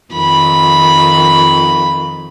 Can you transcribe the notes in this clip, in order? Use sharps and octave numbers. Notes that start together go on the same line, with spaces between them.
F2 D#3 B5